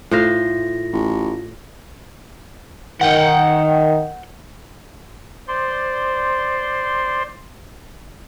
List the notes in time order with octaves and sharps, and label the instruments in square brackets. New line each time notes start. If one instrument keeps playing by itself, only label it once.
[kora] A2 C5 F5 [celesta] F4 A#6
[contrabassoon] A1
[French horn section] D#3 [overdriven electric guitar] F#5 G5
[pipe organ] C5 D5 C6